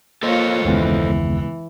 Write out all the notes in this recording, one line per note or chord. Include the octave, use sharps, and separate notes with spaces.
A#3 F4 A4 C5 C#5 D#5
F#1 D#2 C#3 E3 G#3 B3